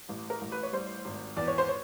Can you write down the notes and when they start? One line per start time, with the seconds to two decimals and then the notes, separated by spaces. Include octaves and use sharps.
0.09 A1
0.30 A#4
0.41 A1
0.52 B4
0.63 C#5
0.73 G3 C5
1.05 G#1
1.37 E2 D5
1.48 C#5
1.58 C5
1.69 C#5